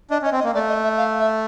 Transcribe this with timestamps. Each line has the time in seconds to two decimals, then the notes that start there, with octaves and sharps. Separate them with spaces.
0.10 D4 D#5
0.22 C#4
0.25 D#5
0.32 C4
0.40 D#5
0.44 A#3
0.54 A3 D5
0.69 D#5
0.84 E5
0.97 F5
1.20 E5